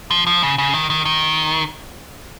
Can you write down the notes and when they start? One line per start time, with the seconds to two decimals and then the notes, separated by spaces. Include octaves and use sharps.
0.11 F3
0.27 F3
0.43 C#3
0.58 C#3
0.74 D#3
0.90 D#3
1.05 D#3